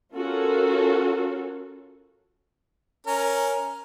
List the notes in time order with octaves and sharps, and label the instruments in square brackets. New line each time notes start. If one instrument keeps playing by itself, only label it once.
[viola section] C#4 F4 F#4 A4 A#4
[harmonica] C#4 A#4